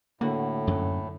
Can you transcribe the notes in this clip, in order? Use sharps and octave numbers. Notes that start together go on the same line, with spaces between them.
A2 D3 A#3 F#4
F#2 F#3